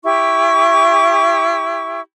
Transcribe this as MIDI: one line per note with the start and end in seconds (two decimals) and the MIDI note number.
0.04 2.00 64
0.04 2.00 67
0.04 2.00 85